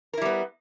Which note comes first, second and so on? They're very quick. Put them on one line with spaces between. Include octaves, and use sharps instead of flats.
A#4 E4 G3 B3